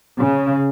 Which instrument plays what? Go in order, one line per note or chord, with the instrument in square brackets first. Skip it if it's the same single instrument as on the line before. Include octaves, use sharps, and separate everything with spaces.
[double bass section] C#3